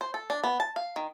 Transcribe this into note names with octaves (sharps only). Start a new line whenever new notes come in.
C5
A4
D4
B3
A5
F5
D#3